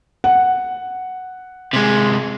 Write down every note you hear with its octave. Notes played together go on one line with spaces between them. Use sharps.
F#5
C3 G#3